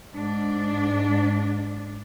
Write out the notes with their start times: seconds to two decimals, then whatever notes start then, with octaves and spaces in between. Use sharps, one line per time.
0.13 G#2 D4